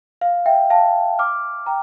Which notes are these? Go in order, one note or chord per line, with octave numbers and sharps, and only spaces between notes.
F5
E5 G5
F5 A5
D6 F6
G5 A#5